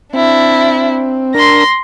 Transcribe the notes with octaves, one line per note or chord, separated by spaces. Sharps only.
C4 D4 E4
D4 A#4 C6 A#6